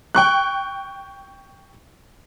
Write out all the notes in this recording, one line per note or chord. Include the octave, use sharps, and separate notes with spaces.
G5 C#6 F#6